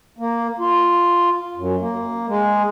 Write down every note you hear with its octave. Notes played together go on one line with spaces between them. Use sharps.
A#3
F4
F#2
A#3
G#3